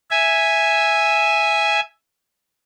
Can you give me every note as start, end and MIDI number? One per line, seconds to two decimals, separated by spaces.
0.11 1.80 76
0.11 1.80 80